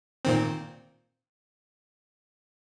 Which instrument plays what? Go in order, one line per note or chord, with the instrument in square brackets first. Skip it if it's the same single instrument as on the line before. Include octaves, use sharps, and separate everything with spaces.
[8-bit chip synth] A#2 D#3 C4